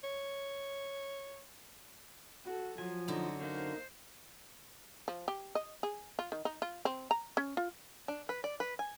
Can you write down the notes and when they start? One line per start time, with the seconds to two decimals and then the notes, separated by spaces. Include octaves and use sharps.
0.03 C#5
2.44 F#4 A4
2.78 F3 F#3 G#5
3.08 F#2 D3 D#4 F#4
3.42 A#3 D#4 C5
5.08 F3
5.28 G4
5.55 D#5
5.83 G#4
6.19 F4
6.32 D#3
6.45 D#4
6.62 F4
6.85 C4
7.11 A#5
7.37 C#4
7.57 F4
8.08 D4
8.29 B4
8.44 D5
8.60 B4
8.79 G#5